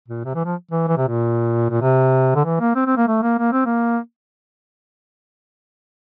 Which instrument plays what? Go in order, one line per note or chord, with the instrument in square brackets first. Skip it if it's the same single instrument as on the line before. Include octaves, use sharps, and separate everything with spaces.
[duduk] A#2
C3
E3
F3
E3
E3
C3
A#2
A#2
C3
D3
E3
A#3
C4
C4
A#3
A3
A#3
A#3
C4
A#3